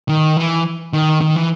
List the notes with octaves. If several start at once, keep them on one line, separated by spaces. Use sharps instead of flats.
D#3
E3
D#3
D#3
E3